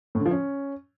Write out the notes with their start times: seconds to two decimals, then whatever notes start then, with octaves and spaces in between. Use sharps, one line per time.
0.15 A2
0.20 D3
0.26 F3
0.31 C#4